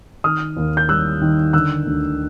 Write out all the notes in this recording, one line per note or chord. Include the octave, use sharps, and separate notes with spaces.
D#3 D#6 F6
D#2
G6
G3 E6 F#6
D#3
D3 E6 F#6
D2